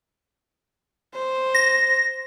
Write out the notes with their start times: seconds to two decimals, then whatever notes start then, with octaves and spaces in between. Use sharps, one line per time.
1.15 C5
1.55 A#6